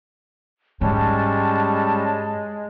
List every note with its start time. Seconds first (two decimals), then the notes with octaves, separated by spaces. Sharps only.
0.81 G#2 G3 G#3 C#4 A5